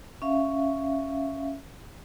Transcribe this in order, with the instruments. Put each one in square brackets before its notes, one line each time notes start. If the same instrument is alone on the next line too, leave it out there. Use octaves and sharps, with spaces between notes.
[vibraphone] C#4 E5 F5